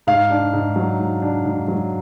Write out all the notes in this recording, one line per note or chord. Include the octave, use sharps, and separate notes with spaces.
G#2 F5
D4
G#2
F#3
G#2
D4
G#2
F#3